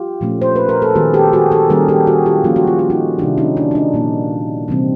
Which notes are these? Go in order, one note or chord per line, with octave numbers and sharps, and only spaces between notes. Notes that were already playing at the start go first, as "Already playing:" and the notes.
Already playing: F4 G4
A#2 F3 A3 C#4
C5
B4
A#4
A4
D#3 G#3 B3 F#4 G#4
G4 A4
F#4 G#4
G4 A4
D#3 G3 A#3 C#4 G#4 A#4
G4 A4
F#4 G#4
F4 G4
F3 A#3 C#4 F4
F#4
F4
F#4
D#4 F4
C3 D#3 G3 D4 E4
C#4 D#4
D4
D#4
D4
A#2 F3 A#3
C3 E3 G3 C4